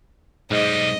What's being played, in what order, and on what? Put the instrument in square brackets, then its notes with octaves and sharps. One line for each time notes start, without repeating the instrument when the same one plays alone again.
[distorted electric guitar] B1 G3 [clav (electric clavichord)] G#2 [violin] D#5